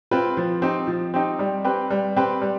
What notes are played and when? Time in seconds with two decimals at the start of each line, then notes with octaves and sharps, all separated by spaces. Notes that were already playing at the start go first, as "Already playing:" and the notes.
0.11 C4 F4 B4
0.37 F3
0.62 C4 D#4 G4
0.87 F3
1.14 C4 D#4 G4
1.39 G3
1.64 C4 G4 B4
1.90 G3
2.16 C4 G4 B4
2.41 G3